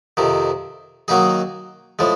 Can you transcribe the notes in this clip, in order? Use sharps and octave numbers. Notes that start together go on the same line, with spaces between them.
F2 C3 D#3
D#3 F#3 A#3 D#4 G#4
A2 F3 G#3